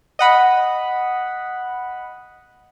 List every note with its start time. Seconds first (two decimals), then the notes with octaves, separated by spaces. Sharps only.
0.19 D#5 F#5 B5